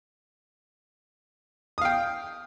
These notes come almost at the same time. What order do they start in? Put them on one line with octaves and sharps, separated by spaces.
D#6 F5 G5